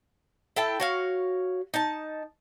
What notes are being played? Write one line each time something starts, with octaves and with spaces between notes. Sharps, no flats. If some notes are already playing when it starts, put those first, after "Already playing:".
E4 A4 G5 A5
F#4 C#5 F5
D#4 A5